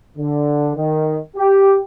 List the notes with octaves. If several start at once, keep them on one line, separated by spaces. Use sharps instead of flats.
D3
D#3
G4